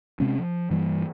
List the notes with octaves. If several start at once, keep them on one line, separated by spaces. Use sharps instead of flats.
C3 G#3 C4 C#4
F3
G2 E3 G3 A#3